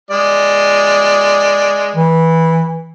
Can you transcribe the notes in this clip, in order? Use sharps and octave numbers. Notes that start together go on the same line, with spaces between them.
G#3 D5
E3